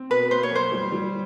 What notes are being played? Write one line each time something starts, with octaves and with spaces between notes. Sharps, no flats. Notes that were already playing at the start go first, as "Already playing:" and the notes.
Already playing: C4
B2 B4
A#3 C5
C#5
F#2 C5
G3
G3